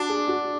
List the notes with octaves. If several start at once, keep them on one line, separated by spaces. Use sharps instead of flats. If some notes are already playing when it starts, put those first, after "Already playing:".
Already playing: D4 F#4
G#4
F#4